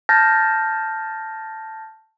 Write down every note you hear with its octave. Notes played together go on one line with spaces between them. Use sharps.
A5 F6 G6 A6 A#6